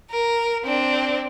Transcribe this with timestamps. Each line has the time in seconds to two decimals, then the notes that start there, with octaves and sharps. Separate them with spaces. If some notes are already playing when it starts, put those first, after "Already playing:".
0.10 A#4
0.64 C4 D4